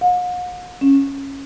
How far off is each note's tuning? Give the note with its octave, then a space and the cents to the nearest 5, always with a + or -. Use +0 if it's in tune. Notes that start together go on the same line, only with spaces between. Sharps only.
F#5 -45
C#4 -10